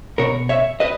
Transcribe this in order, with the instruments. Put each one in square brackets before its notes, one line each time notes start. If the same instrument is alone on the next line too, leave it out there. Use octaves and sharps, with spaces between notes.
[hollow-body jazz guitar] B2 A#4 C#5
C#5 E5
B4 D#5